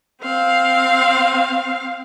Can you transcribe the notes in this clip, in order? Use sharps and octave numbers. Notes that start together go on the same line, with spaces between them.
C4 F5